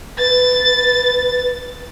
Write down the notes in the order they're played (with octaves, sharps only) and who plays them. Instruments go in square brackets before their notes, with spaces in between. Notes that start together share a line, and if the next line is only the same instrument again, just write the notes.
[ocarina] B4 [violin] A6